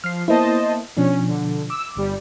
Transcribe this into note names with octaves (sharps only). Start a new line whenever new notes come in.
F3 F6 C7
A#3 B3 E4 C5 D#5 A5
B2 F3 C#4 D4
D3
D6 E6
G1 G3